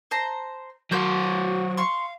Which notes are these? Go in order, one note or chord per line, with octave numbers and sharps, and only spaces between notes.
C5 A5 A#5
F#3 A#3 F#4 C5 G6
F5 C6 C#6